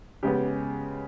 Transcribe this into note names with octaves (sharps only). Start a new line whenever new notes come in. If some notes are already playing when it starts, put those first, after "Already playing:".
C#3 G#3 B3 G4